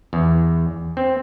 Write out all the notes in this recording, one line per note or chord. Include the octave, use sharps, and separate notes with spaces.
E2
C4